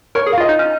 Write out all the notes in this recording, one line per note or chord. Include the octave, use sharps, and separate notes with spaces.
A#4 C#5
G#4
F5
F4
D#5
D#4
C#4